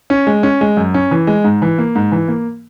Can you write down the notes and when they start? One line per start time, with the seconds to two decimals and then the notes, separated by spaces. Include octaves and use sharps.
0.10 C#4
0.27 G#3
0.43 C#4
0.61 G#3
0.77 F#2
0.94 C#4
1.11 E3
1.27 G#3
1.44 G#2
1.62 E3
1.78 A#3
1.96 G#2
2.12 E3
2.28 A#3